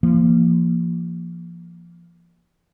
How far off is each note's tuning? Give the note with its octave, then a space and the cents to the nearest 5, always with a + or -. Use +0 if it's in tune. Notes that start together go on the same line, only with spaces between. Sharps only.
F3 -30 A#3 +0